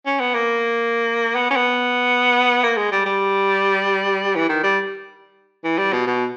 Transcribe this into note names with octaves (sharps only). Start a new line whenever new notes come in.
C#4
B3
A#3
B3
C#4
B3
A#3
G#3
G3
G3
E3
D#3
G3
E3
G3
B2
B2